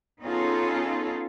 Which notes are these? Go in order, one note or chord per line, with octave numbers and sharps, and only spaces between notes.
B3 C#4 D#4 F4 G#4 A4